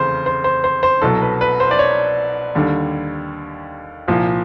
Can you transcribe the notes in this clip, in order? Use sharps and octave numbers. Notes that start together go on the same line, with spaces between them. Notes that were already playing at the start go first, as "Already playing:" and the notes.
Already playing: F1 E2 C#3 C5
C5
C5
C5
C5
C2 B2 F#3 A4
B4
B4
C5
D5
C#5
D#2 D3 G3
C2 A#2 F3